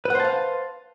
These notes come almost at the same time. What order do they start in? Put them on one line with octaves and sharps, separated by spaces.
B4 F#5 C5 A5 F5